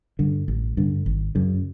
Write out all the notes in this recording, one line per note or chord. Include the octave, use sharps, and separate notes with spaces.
G2 D3
A1
G2 D3
G#1
F#2 C#3